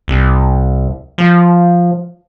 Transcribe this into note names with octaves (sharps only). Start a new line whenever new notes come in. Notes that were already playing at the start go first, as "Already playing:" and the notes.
C2
F3